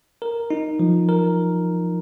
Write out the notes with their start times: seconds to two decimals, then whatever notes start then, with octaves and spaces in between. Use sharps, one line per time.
0.22 A#4
0.50 D#4
0.79 F3
1.09 A#4